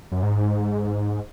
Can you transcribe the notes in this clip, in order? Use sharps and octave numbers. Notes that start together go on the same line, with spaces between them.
F#2
G#2